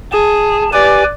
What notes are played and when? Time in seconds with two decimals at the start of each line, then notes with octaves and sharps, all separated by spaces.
0.12 G#4 A5
0.73 G4 B4 D5 G#5